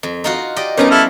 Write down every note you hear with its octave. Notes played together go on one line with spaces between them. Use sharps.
F2
D#4 F4 F#4
G4 D5 D#5
F3 G3 B3 C#4 D#4 A#4 A#5
E4 A4 F6